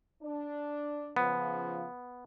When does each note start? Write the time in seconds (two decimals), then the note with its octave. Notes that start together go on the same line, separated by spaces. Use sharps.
0.22 D4
1.16 C#3 F3 B3